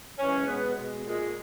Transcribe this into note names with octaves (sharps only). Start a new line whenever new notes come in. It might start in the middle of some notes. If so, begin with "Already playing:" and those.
F#2 C#3 E3 G#3 C#4
B2 G#3 B3
B2 G#3
A#2 G#3